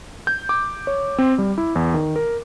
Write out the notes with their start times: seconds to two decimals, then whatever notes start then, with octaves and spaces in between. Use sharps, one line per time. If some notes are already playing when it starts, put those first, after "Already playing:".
0.27 G6
0.49 D6
0.87 C#5
1.18 C4
1.38 G3
1.58 E4
1.76 E2
1.94 D#3
2.16 A#4